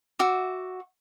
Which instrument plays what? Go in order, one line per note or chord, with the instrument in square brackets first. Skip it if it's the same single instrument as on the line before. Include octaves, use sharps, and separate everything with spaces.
[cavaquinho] F#4 E5 D6